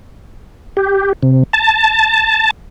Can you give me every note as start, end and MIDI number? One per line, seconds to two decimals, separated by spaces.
0.77 1.13 67
1.23 1.43 48
1.53 2.51 81